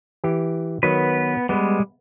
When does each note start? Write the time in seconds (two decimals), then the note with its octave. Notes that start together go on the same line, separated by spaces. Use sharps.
0.24 E3 G4
0.83 D#3 F#3 B3 B4
1.49 G3 G#3 B3 B4